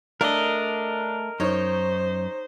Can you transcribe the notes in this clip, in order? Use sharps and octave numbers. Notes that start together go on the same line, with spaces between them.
A3 D4 A#4 D#5
F#2 D#4 C5 C#5